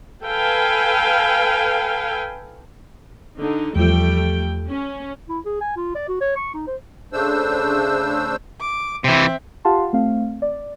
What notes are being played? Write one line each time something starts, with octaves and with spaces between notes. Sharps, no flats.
A4 B4 F5 G5 G#5
D3 D#4
E2 F3 G3 A3 G5
C#4
E4
G#4
G#5
F4
D5
F#4
C#5
C#6
D#4
C5
C#3 A3 D4 C5 E6
D6
C3 E3 C4 E5
F4 G4 F5 F#5 A5 C6
A3 C4 F5
D5